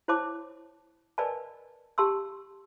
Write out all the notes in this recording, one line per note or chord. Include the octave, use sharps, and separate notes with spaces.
E4 C5 C#5 A5 D6
A#4 B4 D5 D#5 G#5 A5
G4 A5 C6 E6